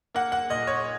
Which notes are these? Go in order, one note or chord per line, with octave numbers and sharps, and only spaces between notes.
A#3 F#5
F#5
A#2 D#5
C#5